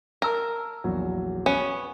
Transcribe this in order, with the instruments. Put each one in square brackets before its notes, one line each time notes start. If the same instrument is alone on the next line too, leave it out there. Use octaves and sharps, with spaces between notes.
[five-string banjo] A#4 [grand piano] A5 A#5 E6
[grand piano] A#1 E2 F#3
[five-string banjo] B3 C#4